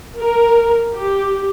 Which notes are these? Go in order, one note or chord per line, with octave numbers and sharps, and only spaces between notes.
A#4
G4